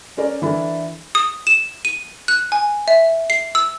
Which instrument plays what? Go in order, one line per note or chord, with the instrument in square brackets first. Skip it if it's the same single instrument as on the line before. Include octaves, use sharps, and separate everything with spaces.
[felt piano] C#4 A4 A#4 D5
E3 D4 E4 A4 A#4
[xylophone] D#6
E7
D#7
F#6
G#5
E5
C7
E6